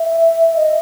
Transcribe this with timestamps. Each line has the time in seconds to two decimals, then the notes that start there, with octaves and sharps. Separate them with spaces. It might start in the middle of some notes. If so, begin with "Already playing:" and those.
Already playing: E5
0.56 D#5